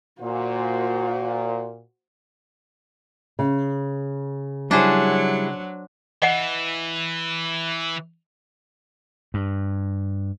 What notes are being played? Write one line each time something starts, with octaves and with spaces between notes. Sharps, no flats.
A#2 F#4 C5
C#3
F#3 G3 D4 E4 G#4 C5
E3 D#5 F#5
G2